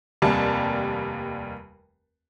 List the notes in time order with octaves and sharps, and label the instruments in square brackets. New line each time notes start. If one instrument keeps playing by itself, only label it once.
[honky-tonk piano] F1 D#2 G3 D5 A5